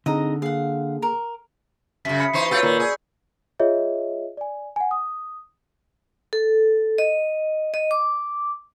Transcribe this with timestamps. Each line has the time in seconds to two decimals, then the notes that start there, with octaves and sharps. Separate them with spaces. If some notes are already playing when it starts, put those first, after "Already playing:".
0.06 D3 C4 D#4 G#4 D#5 A#5
0.42 A#3 G#4 F5 F#5
1.02 A#4
2.05 F#2 C#3 E5 B6
2.20 B5 C#7
2.33 E3 D#4 C5 C#6 C7
2.51 A3 F4 G4 B4 C#5 B5 E6 G6
2.62 A#2 D#3
2.80 G#4 D5
3.59 F4 G#4 C#5 D#5 E5
4.37 D5 G#5
4.76 F#5 G#5
4.91 D#6
6.33 A4
6.98 D#5
7.74 D#5
7.91 D6